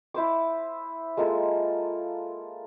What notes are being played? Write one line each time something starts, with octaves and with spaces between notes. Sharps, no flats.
E4 C5 D6
G#3 A#3 F4 A4